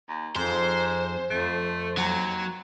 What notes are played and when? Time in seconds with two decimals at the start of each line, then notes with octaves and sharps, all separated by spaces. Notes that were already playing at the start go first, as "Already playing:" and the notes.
0.09 D#2
0.36 F2 G#2 C5
1.30 F2 A3
1.98 D#2 F#3